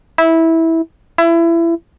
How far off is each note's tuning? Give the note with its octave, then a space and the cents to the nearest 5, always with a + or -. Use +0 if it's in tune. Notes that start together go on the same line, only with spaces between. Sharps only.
E4 -15
E4 +25